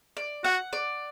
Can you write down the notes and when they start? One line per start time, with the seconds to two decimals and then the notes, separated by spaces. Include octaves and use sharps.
0.17 D5
0.44 F#4 F#5
0.73 D5